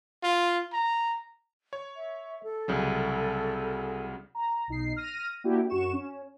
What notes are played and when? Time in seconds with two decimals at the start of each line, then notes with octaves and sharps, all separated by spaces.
0.23 F4
0.73 A#5
1.73 C#5
1.96 E5
2.43 A4
2.68 C2 C#3 F#3
4.35 A#5
4.68 B1 D#4 C7
4.96 F6 A#6 D#7
5.44 A#3 D4 E4 F#4 G4
5.70 F#2 F#4 C#6 E7
5.93 C#4